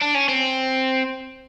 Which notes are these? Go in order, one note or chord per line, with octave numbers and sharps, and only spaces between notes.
D4
C#4
C4